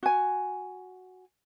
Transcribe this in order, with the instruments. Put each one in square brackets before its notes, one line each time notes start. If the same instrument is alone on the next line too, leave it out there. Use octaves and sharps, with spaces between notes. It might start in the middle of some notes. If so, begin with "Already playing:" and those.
[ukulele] F#4 G#5